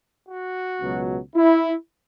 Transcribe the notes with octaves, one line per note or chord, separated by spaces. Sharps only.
F#4
C#2 B2 F#3
E4